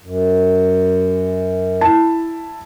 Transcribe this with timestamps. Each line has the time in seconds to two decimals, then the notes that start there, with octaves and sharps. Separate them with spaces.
0.03 F#2
1.81 E4 A5